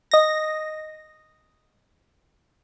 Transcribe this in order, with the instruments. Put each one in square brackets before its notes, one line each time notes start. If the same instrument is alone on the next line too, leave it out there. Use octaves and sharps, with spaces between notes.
[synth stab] D#5 A#6